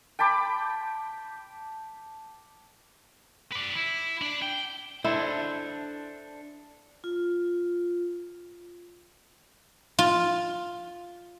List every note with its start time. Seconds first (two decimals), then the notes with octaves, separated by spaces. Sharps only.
0.19 G5 A5 B5 D6
3.52 B4 D5
3.75 E4
4.22 D4
4.42 G5
5.04 D4 E4 A4 C5
7.04 F4
9.99 F4